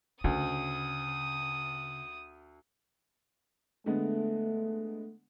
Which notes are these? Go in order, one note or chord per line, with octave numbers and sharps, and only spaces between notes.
D2 C#3 D#6
D3 G#3 A3 B3